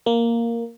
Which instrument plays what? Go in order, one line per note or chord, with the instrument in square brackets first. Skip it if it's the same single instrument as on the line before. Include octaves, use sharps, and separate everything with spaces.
[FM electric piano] A#3